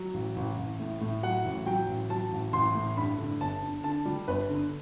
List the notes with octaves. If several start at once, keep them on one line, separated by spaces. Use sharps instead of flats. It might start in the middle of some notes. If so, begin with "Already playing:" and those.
Already playing: F#3
A1
A1
A1
A2
A2
F#3 F#5
A1
F#3 G5
A1
F#3 A5
A1
A1 C6
A2
G2 B5
D3
G1 A5
D3
D3 A5
G3
G1 B4
D3